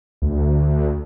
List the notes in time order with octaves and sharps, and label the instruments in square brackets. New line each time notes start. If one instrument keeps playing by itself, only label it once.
[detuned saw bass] D2